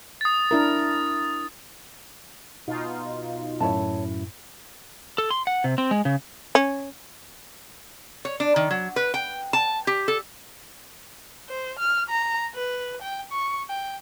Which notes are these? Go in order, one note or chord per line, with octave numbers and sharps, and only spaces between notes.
D#6 A6
D4 E4 A#4
B2 D#4 F4
F#2 A2 E4 C#5 A5
A4
C6
F#5
C3
C4
G#3
C#3
C#4
C#5
D4
D#3
F#3
B4
G5
A5
G4
A4
C5
F6
A#5
B4
G5
C#6
G5